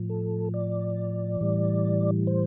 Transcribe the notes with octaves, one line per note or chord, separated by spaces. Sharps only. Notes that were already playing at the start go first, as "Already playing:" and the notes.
Already playing: A2 F3
A4
D5
A2 E3 G3
C5